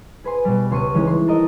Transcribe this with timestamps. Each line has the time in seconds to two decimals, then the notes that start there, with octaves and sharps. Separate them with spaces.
0.24 G#4 B4 G#5 C6
0.45 B2 G3
0.71 C#2 C6 C#6 C#7 D#7
0.94 E3 G#3 C#4 D#4
1.07 C6
1.27 A4 A#4 D#5 E5